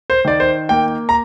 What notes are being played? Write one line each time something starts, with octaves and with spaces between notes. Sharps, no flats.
C5
D#3 D5
C5
A#3 G5
A#5